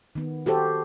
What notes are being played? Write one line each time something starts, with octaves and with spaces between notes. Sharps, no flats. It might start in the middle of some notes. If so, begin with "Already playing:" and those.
D#3 B3
F#4 G4 A4 C5